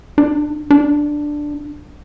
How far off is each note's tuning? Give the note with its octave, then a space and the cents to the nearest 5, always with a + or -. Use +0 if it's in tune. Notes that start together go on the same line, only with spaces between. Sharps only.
D4 +35
D4 +5